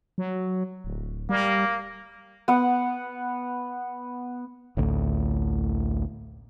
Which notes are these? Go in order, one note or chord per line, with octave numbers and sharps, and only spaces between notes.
F#3
D1
G3 A#3
B3 F#5
A1 D2 A2